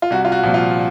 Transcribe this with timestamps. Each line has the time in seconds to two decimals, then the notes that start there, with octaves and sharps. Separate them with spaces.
0.02 F4
0.11 C2 F#4
0.25 F4
0.32 F#4
0.43 A#2 F3
0.54 F4